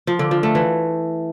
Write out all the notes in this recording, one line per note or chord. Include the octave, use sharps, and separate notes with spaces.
F3
D3
F3
A3
E3